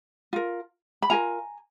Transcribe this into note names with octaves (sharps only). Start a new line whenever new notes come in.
F4 A#4
B5
F4 A#4 G#5 A#5